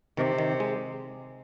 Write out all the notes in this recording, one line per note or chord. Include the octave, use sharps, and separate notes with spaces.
C3 D#3
D#3
G#3